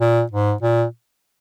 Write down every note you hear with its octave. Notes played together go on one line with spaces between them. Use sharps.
A#2
G#2
A#2